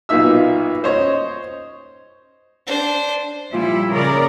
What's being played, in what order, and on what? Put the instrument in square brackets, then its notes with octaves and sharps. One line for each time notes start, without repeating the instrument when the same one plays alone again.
[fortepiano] B1 A#2 A#3 D#4 E5 E6
C5 C#5 D#5
[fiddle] D4 C5
[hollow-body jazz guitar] A#2 F3 F4 [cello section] G3 E4
[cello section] C#3 A#4 D5